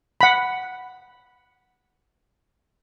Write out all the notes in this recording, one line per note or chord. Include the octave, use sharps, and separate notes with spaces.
F#5 B5